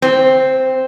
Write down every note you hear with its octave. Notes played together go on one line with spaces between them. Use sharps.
C4